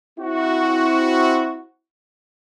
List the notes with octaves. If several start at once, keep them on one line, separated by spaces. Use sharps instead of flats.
C4 E4 F#4